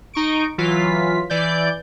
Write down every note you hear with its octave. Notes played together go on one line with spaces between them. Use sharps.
D#4 C#6 D7
E3 F#3 F4 B6
E3 D5 G6